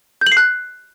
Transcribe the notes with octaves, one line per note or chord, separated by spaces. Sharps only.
G6
F#7
C7
F#6